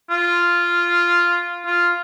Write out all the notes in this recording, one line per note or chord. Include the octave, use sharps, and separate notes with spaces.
F4
F4